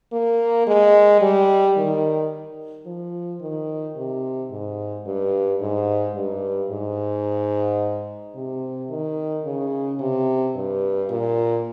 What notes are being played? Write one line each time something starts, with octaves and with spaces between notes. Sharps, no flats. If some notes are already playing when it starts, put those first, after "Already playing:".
A#3
G#3
G3
D#3
F3
D#3
C3
G#2
G2
G#2
G2
G#2
C3
D#3
C#3
C3
G2
A#2